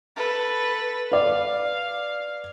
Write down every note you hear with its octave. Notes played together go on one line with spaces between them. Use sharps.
A4 B4
B4 D5 F5